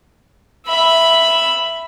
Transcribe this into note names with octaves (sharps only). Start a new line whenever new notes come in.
E5 B5